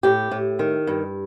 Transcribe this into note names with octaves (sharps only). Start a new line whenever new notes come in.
A2 G4
A2
D#3
G2